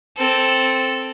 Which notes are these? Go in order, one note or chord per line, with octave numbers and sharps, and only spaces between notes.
C4 A4